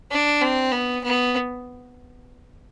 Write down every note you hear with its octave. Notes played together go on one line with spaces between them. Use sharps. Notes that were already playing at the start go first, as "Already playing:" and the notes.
D4
C4
B3
B3